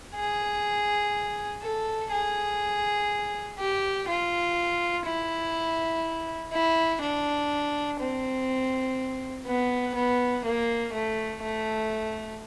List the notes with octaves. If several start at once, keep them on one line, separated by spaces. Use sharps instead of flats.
G#4
A4
G#4
G4
F4
E4
E4
D4
C4
B3
B3
A#3
A3
A3